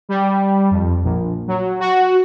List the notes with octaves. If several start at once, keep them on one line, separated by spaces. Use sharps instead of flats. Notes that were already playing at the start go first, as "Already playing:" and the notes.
G3
F2
A#1
F#3
F#4